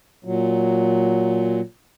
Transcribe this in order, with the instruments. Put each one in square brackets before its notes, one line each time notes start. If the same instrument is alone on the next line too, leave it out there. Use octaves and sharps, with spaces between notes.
[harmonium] A#2 F#3